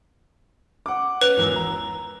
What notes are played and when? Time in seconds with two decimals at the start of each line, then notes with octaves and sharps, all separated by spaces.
0.86 F#5 D6
1.21 C#4 B4 F7
1.37 G#1 E2 E6
1.56 A#5